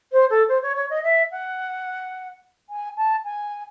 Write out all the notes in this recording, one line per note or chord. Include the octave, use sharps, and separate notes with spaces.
C5
A4
C5
C#5
C#5
D#5
E5
F#5
G#5
A5
G#5